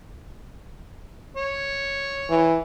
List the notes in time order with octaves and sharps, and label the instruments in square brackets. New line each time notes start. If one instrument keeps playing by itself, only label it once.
[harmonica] C#5
[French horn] E3